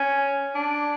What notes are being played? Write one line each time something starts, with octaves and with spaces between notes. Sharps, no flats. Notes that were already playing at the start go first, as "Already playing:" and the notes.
Already playing: C#4
D4